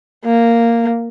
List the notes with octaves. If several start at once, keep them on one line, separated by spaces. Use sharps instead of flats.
A#3